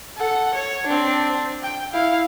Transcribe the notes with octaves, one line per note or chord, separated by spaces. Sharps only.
A4 F#5
C#5
C4 D4
G5
E4 F5